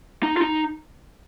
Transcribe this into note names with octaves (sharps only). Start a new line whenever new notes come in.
D#4
F4
D#4